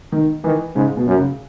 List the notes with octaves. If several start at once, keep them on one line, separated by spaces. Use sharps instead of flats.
D#3
D#3 E3
G#2 C#3
B2
F#2
C#3